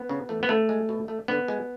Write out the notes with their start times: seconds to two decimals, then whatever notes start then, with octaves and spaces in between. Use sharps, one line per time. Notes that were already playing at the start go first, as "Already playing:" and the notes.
Already playing: B3
0.09 C#3
0.29 E3 A3
0.43 B3
0.49 C#3 A3
0.69 G#3
0.89 B2
1.08 A3
1.28 D3 B3
1.48 G#3